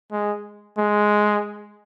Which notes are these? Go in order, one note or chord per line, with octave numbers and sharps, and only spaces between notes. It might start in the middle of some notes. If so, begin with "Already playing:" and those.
G#3
G#3